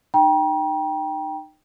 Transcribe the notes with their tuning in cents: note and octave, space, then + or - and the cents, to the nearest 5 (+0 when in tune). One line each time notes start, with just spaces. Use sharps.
D#4 -30 G5 +0 A#5 +40